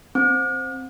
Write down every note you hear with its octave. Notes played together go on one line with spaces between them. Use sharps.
C4